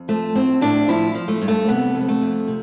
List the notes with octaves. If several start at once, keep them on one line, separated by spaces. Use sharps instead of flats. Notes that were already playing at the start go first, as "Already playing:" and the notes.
Already playing: F2
F3 A3
A2 C4
A2 D4
F3 E4
F3
A3
G2
A3
C3 B3
F2
B3
A3
F2
C3